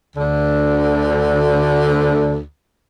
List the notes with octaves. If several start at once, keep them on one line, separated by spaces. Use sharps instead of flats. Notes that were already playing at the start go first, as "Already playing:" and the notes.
D2 D3